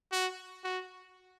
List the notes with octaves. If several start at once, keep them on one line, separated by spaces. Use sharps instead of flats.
F#4
F#4